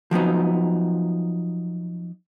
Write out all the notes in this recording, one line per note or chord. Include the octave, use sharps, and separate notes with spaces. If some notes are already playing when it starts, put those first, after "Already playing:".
F3 F#3 B3 D#4